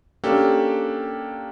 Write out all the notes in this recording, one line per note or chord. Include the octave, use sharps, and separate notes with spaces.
A#3 C#4 D4 G4 A4